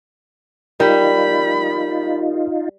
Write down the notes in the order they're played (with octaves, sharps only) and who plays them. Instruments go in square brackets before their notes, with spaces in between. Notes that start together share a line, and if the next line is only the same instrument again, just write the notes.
[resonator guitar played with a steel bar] G3 [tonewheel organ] D#4 F4 [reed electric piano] A#4 [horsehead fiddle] B5